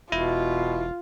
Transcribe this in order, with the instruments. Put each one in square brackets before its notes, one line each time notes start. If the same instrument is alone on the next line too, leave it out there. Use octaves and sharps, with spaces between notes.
[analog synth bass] E1 [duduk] B2 [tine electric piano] E4 [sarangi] F4